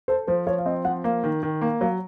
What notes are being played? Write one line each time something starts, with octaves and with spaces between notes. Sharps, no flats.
A4 C5
F3 C5
F3 C#5
F5
C4 D#5
F3 F#5
A#3 F5
D#3
D#3
A#3
F#3 F5